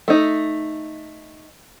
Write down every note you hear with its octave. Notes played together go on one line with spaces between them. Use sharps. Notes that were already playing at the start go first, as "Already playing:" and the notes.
A3 D#4